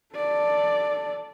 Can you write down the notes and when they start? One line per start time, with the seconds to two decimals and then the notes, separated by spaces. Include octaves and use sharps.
0.15 A4 D5